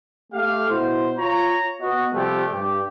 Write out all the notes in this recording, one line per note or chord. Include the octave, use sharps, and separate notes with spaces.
A3 G4 F5
B2 E4 F#4 C5
F4 C#5 A#5
B3 F#4 D#5
C3 F3 G3 A3 F4 G4
G2 G4